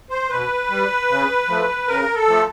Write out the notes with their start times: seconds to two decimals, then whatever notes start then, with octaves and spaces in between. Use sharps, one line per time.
0.10 C5
0.30 B2 B4
0.70 G3
1.09 C#3
1.48 F3 A3
1.87 C#3 A#4
2.15 A4
2.27 F3 A3